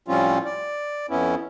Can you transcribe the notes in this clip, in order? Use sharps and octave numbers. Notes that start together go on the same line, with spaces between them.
A2 F3 G3 C4 C#4 F4
D5
F2 B3 C#4 E4